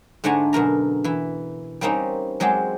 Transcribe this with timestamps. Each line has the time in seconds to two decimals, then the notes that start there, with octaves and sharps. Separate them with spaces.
0.24 G#2 D3 A3 D4 G#5 A#5
0.53 F#2 B2 A#4 A#5
1.04 E3 E4
1.81 G3 A#3 C4 C#4 D#4
2.40 F#3 G#3 C4 G4